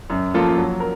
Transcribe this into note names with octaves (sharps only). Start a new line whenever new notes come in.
F#2
F3 A#3 F4 A4
F#3
A#4